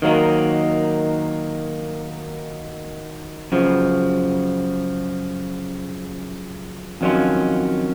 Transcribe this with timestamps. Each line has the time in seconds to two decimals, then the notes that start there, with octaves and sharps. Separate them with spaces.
0.02 D#3 F#3 A#3 D#4
3.52 F#2 C#3 F3
7.01 F2 D#3 F#3 C#4 F4